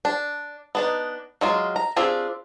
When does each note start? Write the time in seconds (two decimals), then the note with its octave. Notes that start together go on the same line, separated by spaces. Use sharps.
0.05 D4
0.75 B3 D4 D#4
1.41 F#3 G#3 F4
1.76 A#5
1.96 C4 D4 F4 G4 G#4